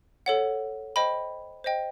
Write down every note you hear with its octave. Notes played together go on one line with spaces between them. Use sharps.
A4 C#5 F#5
C5 D#5 G5 B5
C5 D#5 G5